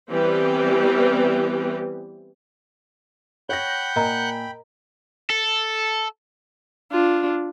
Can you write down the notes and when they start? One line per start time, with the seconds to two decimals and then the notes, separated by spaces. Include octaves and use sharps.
0.11 E3 G3 B3 C4 G4 B4
3.49 C#5 F#5 G5 B5 F#6 G6 A#6
3.96 A#2 A#4 D#5 G#5 A#5
5.30 A4
6.91 D4 F4